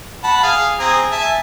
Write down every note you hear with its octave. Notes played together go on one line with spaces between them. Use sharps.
F#5 A5 B5
G#4 F5
C4 G#4 A#5
E5 G#5 A5